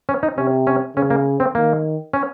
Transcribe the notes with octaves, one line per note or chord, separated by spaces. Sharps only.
C#4
D#4
C3 C#4
C#4
C#3 C#4
A#3
C4
D#3 A#3
C#4